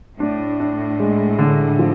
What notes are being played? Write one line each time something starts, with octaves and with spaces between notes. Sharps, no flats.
A2 D4
D4
G#3
D3
F3